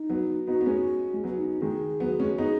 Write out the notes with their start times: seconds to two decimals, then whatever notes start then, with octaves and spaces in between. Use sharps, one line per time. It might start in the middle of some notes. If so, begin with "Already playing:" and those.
Already playing: D#4
0.09 F#3 B3
0.47 B3 D#4 F#4
0.61 B3
0.66 G#3 C#4
1.14 G#3
1.24 F#3 B3
1.37 D#4
1.49 D#4
1.62 D#3 G#3 G#4
2.00 F#3 B3
2.20 G#3 C#4
2.38 B3 D#4 G#4